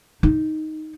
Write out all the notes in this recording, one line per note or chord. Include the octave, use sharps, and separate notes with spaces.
D#4